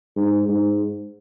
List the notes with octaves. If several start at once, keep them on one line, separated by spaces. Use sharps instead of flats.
G#2
G#2